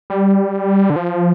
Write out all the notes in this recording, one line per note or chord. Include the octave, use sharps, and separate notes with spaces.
G3
D3
F3